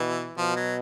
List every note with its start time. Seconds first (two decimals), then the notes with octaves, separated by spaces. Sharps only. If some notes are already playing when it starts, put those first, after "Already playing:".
Already playing: B2 E3
0.38 B2 F3
0.56 F#3